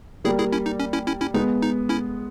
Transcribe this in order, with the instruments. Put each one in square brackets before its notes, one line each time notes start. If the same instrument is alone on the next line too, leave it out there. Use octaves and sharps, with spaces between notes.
[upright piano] G3 A#3 [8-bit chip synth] E4 G#4
[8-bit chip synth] E4 G#4
C#4 E4
D#4
C#4
C#4 E4
C#4 E4
C#4 E4
[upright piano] G#3 B3 [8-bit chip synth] D#4
[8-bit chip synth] D#4
C#4 E4